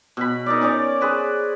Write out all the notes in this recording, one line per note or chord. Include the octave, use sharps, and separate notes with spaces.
B2 B5
D#4 A#4 D5
C#4 A#4 C#5 D5
G#4 B4 C5